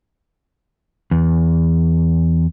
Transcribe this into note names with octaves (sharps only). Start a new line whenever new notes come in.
E2